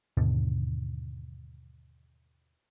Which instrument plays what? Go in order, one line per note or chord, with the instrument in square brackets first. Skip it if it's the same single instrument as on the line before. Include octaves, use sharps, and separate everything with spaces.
[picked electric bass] D#2 G#2 B2 D3